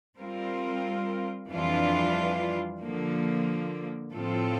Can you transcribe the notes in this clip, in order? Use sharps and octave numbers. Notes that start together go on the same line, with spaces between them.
G3 C4 F4 A#4
F2 E3 G3 D4 F4
D3 F3 A#3
A2 F3 C4 F4 A4